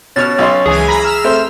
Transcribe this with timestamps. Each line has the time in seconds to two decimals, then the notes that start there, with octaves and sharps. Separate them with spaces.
0.16 B2 C#4 C#5 F6 A6
0.38 B1 D#5 C6
0.66 C#2 E3 G#4 G#5
0.88 A#5 B5
1.03 E6 F6 E7
1.24 A3 C4 C5